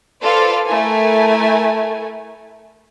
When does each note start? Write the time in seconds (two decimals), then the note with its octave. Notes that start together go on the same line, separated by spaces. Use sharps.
0.23 F4 A4 B4 C5 D5 F5
0.66 A3 E4 A#4 G#5